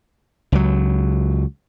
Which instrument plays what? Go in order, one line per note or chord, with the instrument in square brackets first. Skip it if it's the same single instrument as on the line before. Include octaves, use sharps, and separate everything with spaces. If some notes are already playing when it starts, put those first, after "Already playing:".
[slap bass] C#2 F#3